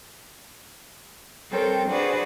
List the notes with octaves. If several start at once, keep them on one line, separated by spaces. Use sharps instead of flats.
G3 C4 A4 A#4 C#5 G5
D4 F#4 G#4 B4 C5 D5